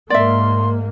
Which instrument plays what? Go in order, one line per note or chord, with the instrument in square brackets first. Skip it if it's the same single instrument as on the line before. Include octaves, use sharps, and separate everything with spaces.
[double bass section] G#2 A#3 [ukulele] D5 E5 [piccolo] C6